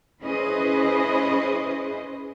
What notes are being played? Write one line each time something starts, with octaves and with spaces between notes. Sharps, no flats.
C#4 E4 G#4 B4 C5 D#5